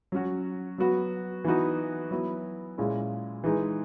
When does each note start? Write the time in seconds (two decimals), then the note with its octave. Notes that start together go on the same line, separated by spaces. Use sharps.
0.12 F#3 C#4 F#4
0.78 F#3 B3 F#4
1.44 E3 B3 D#4 F#4
2.11 F#3 B3 E4
2.78 A#2 G#3 C#4 E4
3.44 E3 G#3 D#4